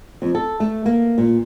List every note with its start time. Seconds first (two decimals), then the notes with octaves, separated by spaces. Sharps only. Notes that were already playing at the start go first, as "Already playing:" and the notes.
0.22 F2
0.35 A4
0.60 A3
0.86 A#3
1.18 A#2